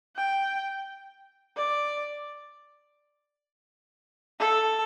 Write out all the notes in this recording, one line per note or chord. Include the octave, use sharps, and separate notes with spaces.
G5
D5
A4